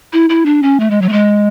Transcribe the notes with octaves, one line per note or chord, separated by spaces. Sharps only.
E4
E4
D4
C#4
A3
G#3
F#3
A3
G#3